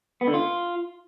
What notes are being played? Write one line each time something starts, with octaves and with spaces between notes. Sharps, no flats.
B3
D3
F4